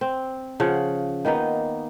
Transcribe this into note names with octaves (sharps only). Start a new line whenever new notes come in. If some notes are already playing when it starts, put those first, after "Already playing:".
C4
C#3 F3 F5 F#5
D#3 A#3 B3 D#4